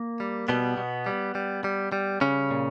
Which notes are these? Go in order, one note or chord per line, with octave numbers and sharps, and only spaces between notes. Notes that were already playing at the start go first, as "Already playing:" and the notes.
Already playing: A#3
G3
B2 G3 B3
B2
G3
G3
G3
G3
C#3 G3 C#4
A#2